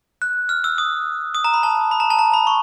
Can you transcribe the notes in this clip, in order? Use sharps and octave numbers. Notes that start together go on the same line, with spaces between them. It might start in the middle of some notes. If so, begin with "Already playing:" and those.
F#6
F6
E6
D#6
D#6
A#5
B5
A5
B5
A#5
A5
A#5
B5
C#6